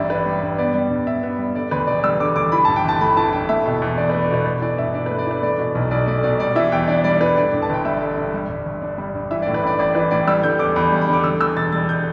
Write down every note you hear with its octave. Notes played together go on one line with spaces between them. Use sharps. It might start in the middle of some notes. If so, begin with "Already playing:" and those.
Already playing: A1 G2 G3 D5 E5
D4 B4
G3
G2
B3 D5
G3
G2
G2 E5
B3
G3
D3 D5
D2 B4
E1 D5
G3 E6
D3 D6
D2 D6
E3 B5
G2 A5
G5
G1 A5
A3 B5
E3 A5
G2 G5
A3 E5
B2
E2
D4 D5
B4
A3
D5
B2 B4
A3 B4
E3 D5
G2 E5
D4 D5
B4
A3
D5
E3 B4
A3 D5
B2
B1
B1 D5
A3 D5
B2 D5
G3 D5
E3 E5
E2 G5
D4 D5
G3 D5
E3 B4
D3 D5
G2
A5
G1 G5
G3 E5
D3
G2
G3
G2
G1
D4
G3
G2
E3 E5
D5
A2
B4
A1 D5
A1 D5
E3 B4
A2 D5
G3 E6
D3 G6
E2 D6
E2 B5
G3
B5
D3 D6
D3 E6
E2 E6
E1 A6
G3 A6
D3 G6